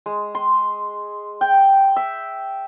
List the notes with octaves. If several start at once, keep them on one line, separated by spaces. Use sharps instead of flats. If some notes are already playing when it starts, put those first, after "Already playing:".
G#3
C6
G5
E5